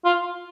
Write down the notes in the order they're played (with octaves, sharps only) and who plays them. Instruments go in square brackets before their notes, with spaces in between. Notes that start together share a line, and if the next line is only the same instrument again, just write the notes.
[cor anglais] F4